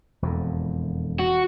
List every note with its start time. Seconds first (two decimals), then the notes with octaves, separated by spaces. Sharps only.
0.22 E1 F2
1.19 F#4